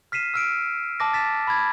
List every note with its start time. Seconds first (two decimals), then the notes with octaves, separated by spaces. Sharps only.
0.12 F6 B6 C7 D#7 E7
0.34 E6 F6 D7
1.00 A5 D6 A#6
1.13 A6 B6 E7
1.47 B5 G#6